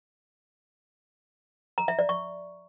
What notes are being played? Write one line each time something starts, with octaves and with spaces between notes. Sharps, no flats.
A#5
E5
D5
C#6